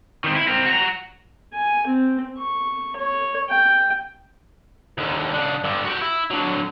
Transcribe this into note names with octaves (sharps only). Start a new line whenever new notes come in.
D#3 C4
E4
C4 A#4
F#4 A#5
G#5
C4
C#6
C#5
G5
D#2 D3
C#3 D4
G2 D3
F#4 G4
E4
D3 F#3